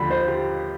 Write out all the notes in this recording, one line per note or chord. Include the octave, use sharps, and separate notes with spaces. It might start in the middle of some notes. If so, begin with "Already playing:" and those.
Already playing: D#2 D3 F3 B5
C5
G4